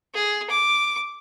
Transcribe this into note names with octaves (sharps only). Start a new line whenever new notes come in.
G#4
D6